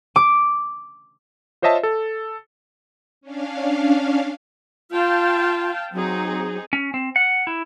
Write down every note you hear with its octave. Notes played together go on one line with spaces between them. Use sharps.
D6
F4 C5 C#5 D#5 E5 A5
A4
C#4 D4 F5
F4 F5 G5 A5
F#3 C4 D#4 G#4
C#4
C4
F#5
E4